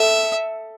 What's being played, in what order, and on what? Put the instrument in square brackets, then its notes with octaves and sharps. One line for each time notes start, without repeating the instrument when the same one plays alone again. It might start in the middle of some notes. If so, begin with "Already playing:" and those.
Already playing: [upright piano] A4 [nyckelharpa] E5